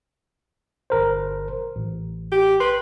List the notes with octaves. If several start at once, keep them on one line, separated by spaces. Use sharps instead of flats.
G1 A#4 C5
A1
G4
B4 C6